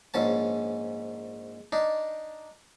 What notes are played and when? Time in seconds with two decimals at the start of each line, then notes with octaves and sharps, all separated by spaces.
0.14 A#1 G#2 C#4 A5
1.72 D4 D#4